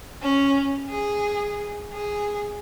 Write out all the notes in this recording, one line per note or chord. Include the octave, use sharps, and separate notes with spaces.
C#4
G#4
G#4